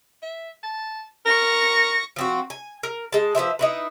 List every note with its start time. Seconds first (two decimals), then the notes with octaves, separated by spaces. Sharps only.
0.22 E5
0.63 A5
1.26 A#4 C#6 A#6
2.16 F3 C4 F#4
2.50 G#5
2.83 A#4
3.12 G#3 A5
3.35 F3 B4 C5 E5
3.59 D#4 E4 B4